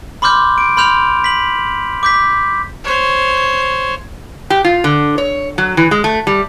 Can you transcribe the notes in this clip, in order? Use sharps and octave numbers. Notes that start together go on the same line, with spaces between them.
B5 C6 D6 F6 G6
D7
B5 C6 F6 G6 F7
B6 F#7
D6 G6 B6
C5 C#5
G4
F4
D3
C#5
F#3
E3
G#3
A3
G3